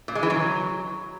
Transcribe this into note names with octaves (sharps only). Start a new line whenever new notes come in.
A#2
G#3
E3
F#3